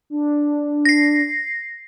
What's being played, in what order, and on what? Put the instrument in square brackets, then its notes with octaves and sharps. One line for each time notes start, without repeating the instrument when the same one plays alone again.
[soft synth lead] D4
[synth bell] A#6 C7